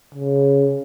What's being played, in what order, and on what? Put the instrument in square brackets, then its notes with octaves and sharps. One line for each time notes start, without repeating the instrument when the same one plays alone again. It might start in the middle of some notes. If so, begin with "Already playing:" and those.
[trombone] C#3